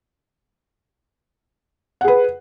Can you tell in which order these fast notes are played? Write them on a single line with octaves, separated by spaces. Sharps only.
F#5 G#4 B4